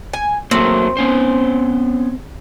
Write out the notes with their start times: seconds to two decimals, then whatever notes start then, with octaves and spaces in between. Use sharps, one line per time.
0.13 G#5
0.51 F#3 A3 A#3 C4
0.97 B3 C#4 C5